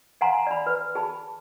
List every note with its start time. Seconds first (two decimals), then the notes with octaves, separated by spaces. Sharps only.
0.21 F5 F#5 G#5 A#5 C6
0.47 D5 B5
0.66 B4
0.95 G#4 A5 B5